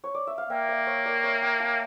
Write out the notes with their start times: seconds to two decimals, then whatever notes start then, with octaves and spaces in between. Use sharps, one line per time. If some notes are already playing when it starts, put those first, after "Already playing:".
0.04 C#5
0.14 D5
0.27 E5
0.38 F5
0.50 A#3 E5 G5
0.69 D5 F5
0.87 C#5 E5
1.05 A#4 D5
1.23 C#5 E5
1.42 E5 G5
1.60 F5 A5